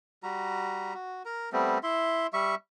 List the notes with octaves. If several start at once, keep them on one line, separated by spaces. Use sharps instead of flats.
G3 F#4 A#5
F#4
A#4 A#5
G3 A3 B3 C4
E4 E5 C6
G3 E5 C#6